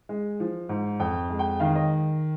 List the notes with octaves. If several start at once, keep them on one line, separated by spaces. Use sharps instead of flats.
G#3
F3
G#2
F2 G5
G#3
G5
D#3 F5
D#5